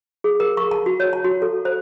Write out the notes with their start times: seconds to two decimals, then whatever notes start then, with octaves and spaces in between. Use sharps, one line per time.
0.24 G#4
0.40 A#4
0.57 C#6
0.71 A5
0.86 F#4
1.00 C#5
1.13 A5
1.24 F#4
1.42 A4
1.65 C5